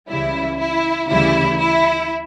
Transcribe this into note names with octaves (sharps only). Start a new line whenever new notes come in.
C#2 C#3 E3 G3 E4
E4
D2 C#3 E3 G3 E4
E4